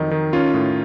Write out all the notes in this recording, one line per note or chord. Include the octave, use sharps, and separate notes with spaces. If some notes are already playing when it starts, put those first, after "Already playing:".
Already playing: F2 D#3 F#3 D#4
D#3
C#4 F4
A2